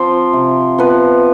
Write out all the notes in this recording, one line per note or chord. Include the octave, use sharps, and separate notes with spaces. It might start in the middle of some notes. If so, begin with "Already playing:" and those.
Already playing: F3 C4 C5
C3
F3 B3 B4